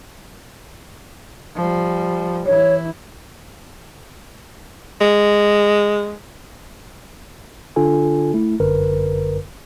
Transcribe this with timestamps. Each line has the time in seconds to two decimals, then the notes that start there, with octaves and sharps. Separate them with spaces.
1.55 F3 G3
2.46 E3 E4 C#5
5.01 G#3
7.76 D3 D4 F4 A4 G#5
8.34 A3 E4
8.60 G1 F#2 D3 A#4 B4